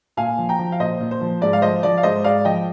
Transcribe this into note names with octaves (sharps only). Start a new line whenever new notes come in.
A#2 F5 G#5
F3
G5 A#5
F3
F5
A#2 C5 D#5
A#2
C5
F3
G#2 D5
F5
F3 C5 D#5
F3 D5
F5
G#2 C5 D#5
G#2 D5 F5
F3 D#5 G5